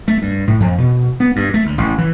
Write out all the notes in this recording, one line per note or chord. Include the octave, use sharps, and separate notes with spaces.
A3
G2
A2
F2
B2
B3
G2
A3
D2
A1
E3